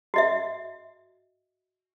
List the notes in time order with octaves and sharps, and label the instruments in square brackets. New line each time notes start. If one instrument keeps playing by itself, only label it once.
[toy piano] F#4 D#5 E5